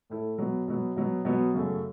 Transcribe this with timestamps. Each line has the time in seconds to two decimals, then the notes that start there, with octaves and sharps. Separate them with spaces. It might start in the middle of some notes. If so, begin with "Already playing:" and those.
0.10 A2 A3 E4 A4
0.38 B2 F#3 B3
0.68 B2 F#3 B3
0.97 B2 F#3 B3
1.25 B2 F#3 B3
1.54 F#2 C#3 A3